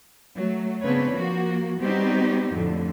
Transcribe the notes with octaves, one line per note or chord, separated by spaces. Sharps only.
F#3 A3
C#3 B3 C4 D4 B4 C#5
F3 A#3 F#4
G3 B3 C4 D#4 F#4 G4
F2 A2 D3